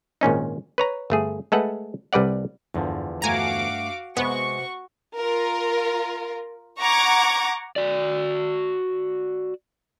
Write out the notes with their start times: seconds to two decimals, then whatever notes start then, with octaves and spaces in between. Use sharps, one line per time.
0.21 G#1 A#2 C#4 D#4
0.78 B4 C#5 A#5
1.10 G1 A3 G#4
1.52 G#3 A3 A4 B4 F#5
2.13 C2 G3 B4 D5 F#5
2.74 E2 G2 D3 F3
3.22 G2 A3 D4 F#4 F5 G#5 A#5 D6
4.17 C3 G#3 B3 F#4 C5 C#6
5.17 F4 A#4
6.80 F#5 A#5 C#6 D6 G#6
7.76 F#4 D5